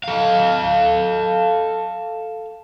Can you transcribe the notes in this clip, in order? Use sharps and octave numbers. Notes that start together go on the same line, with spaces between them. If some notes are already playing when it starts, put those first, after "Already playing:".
A4 F5